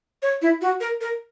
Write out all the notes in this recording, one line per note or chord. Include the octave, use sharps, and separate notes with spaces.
C#5
E4
F#4
A#4
A#4